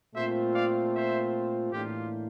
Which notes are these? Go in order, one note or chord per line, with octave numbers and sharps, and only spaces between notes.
A#2 A3 C4 F4 C5 E5
D5 F5
C5 E5
A2 E3 A#3 D4 F4 G4